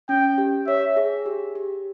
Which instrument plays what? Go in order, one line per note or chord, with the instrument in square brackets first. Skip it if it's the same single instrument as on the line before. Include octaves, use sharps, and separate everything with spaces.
[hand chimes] C#4 [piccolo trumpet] G5
[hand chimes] G4
[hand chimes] C#5 [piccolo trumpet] E5
[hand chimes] G#4
G4
G4